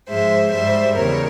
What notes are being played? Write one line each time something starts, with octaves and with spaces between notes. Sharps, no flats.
G#2 F3 G#3 C5 E5
G#2 G3 C5 E5
E2 C#3 G3 A#4 C#5